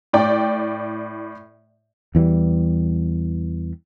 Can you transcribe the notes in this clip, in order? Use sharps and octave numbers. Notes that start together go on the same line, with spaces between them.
A2 D5 G5
E2 E3 F#3 G3